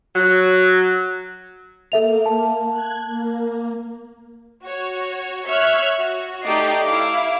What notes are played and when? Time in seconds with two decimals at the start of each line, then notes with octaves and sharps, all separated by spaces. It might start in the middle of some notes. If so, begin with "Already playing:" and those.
0.15 F#3
1.92 A#3 A4 E5 F7
2.26 A5
2.71 F#6 G#6
3.06 A#3
4.62 F#4 C#5
5.46 C#5 E5 C#6 F6 F#6
5.99 F#4
6.44 A3 D#4 G4 D5 D#5 C7
6.85 E4 F5 D6